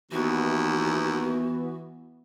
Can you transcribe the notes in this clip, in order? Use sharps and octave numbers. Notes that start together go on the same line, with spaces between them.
D#2 E3 B3 F#4